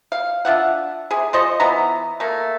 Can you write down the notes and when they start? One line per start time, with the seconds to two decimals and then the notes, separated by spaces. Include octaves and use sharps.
0.12 F5
0.45 D4 F4 E5 F#5
1.11 C3 G#4
1.33 F3 C5 D#5 C#6
1.60 E3 B3 A#5
2.20 A3 A#3